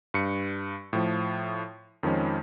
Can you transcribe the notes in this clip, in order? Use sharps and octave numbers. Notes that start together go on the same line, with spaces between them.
G2 C#7
A2 F3
F2 D#3 F3 G#3 C#4